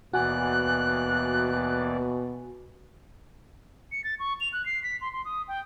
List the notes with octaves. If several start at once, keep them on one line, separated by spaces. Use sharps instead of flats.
D#2 B2 E3 F#4 D5 G#5 F#6
C#7
A6
C#6
F7
F#6
C7
B6
C6
C6
D#6
G5